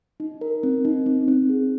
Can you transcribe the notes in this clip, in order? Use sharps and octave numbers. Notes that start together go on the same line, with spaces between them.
D#4
A#4
C4
D#4
C4
C4
G#4